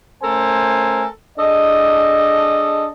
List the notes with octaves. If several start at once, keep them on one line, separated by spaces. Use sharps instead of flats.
A3 C#4 A4 A#4 C5 G#5
D4 G#4 A4 D#5